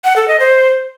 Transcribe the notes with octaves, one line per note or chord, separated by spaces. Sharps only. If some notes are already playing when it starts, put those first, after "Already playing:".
F#5
A4
D#5
C5